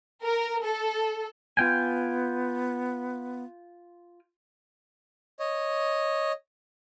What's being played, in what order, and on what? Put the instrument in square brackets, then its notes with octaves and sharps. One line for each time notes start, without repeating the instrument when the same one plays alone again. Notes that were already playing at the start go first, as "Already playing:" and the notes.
[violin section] A#4
A4
[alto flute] B3 [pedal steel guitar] F4 G5 G#5
[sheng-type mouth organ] C#5 D#5